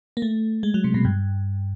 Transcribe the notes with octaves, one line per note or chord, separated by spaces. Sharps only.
A#3
A3
G#3
F#3
C3
B2
G2